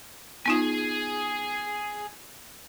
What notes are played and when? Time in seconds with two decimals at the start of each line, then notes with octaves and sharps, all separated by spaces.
0.46 B3 D#4 F4 G#4 G#5